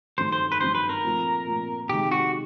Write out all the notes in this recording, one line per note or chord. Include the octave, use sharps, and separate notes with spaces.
G2 D#3 F#3 A3 D4 C5
C5
B4
G2 D#3 F#3 A3 D4 C5
B4
A#4
A#2 F3 A3 C4
A#2 F3 A3 C4
C3 D#3 G#3 G4
F#4